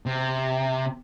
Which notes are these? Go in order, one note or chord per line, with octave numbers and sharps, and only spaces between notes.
C3